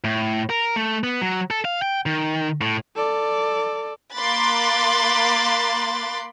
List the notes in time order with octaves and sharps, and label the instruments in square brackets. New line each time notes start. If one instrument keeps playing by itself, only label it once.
[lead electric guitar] A2
A#4
A3
B3
F#3
A4
F5
G5
D#3
A2
[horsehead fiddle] A4 D5
[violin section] A#3 B5 C6 D6 F#6 A6